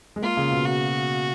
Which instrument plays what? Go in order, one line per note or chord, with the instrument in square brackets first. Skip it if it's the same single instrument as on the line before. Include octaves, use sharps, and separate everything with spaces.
[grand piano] G#3
[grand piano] A#3 [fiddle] F4
[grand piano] C#3
B2
[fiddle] F#4